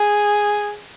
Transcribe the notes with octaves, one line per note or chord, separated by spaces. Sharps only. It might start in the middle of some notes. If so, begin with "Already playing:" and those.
Already playing: G#4